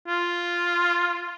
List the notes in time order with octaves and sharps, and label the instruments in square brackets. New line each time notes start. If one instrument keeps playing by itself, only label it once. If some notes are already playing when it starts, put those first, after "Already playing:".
[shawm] F4